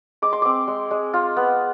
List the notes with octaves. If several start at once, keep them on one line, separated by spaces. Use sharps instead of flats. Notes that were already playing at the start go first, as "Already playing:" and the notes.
G#3 D6
C6
C4 D6
G#3
G#3
F4
B3